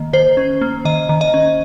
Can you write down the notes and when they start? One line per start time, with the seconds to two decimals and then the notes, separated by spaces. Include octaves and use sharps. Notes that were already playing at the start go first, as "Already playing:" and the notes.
Already playing: D#3 A#3
0.13 D#3 C5
0.37 C#4
0.62 A#3
0.85 D#3 D#5
1.09 D#3
1.21 D#5
1.34 C#4